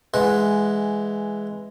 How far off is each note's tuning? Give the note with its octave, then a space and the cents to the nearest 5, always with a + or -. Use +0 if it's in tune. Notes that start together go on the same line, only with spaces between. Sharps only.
E3 +10 G#3 +0 F#5 -15